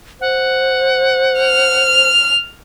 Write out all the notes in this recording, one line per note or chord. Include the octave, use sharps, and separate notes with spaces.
C5 F#5
F6